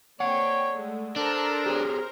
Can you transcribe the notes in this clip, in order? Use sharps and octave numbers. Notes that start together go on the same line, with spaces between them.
A#3 C4 C#5 D5 F#5 G5
G#3 A3
D4 A4 A#4 C5 A#5
G4 G#4 C#5